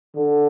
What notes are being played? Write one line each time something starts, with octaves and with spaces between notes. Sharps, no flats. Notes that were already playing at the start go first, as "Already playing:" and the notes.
D3